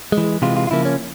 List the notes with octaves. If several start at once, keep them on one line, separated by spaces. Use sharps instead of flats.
G#3
E3
C3 E3 G#3 F4
F4
F4
C#3 F3 A#3 E4
C#4